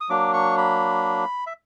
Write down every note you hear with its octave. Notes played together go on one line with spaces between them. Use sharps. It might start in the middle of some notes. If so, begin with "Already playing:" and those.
D#6
F#3 A#3 D4 D6
C#6
B5
E5